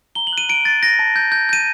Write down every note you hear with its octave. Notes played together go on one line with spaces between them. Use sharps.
A#5 G7
F#7
F#6 D#7
A#5 D7
F#6 A6
G6 A#6
A5
G6
G6
G6 D#7